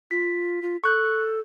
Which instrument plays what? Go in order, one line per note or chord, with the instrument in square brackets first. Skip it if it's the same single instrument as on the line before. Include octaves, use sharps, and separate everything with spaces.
[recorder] F4 [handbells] B6
[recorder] F4
[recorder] A4 [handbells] C#6 F#6 G6